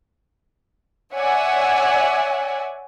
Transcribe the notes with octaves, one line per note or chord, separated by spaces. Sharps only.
C#5 D5 E5 F#5 G#5